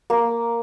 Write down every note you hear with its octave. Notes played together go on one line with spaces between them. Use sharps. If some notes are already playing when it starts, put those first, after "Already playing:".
A#3